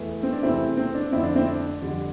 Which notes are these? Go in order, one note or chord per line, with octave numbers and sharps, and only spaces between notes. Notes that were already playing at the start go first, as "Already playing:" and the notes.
Already playing: E2 E3 A3
C4
D4
E2 C3 E3 A3 C4 E4
C4
D4
F2 D3 A3 C4 E4
D4
C4 E4
D4
F2 D3 G3